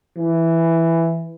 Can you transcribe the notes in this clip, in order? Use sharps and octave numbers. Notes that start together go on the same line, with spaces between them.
E3